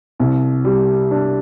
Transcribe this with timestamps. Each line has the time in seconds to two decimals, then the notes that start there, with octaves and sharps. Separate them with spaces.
0.19 C2
0.65 G3
1.11 D4